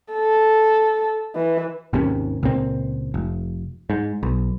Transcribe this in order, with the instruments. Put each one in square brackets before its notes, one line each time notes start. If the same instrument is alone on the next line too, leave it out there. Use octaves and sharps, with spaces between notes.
[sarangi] A4
E3
[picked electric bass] G#1 D#2 C3 C#4
C#2 A#2 C4
F1
G#2
B1